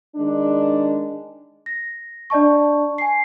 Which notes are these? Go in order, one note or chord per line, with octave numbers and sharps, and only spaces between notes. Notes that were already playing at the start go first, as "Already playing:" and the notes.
D#3 G#3 D4
A#6
D4 D5 D#5 A5 C#6
G#5 C7